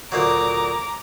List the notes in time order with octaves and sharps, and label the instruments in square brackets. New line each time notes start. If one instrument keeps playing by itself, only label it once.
[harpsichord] D2 A#2 F#3 [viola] A#5 D6